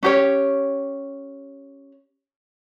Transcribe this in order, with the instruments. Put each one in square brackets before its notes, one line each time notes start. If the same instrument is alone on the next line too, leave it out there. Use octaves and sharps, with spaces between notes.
[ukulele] C#4 G4 C#5